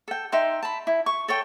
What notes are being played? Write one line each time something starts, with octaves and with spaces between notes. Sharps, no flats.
A4 G5
D#4 E5 G5 C6
A5 B5
E4
C#6
A4 C#5 G5